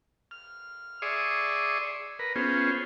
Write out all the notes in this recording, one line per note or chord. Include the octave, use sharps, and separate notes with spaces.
F6
G#4 D5 E5 C6 C#6 D#6
A#4 B4
B3 C#4 F4 G#4 C5